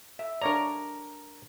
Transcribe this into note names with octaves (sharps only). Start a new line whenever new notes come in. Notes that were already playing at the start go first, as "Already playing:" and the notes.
E5
D4 A#4 C#5 D5 A#5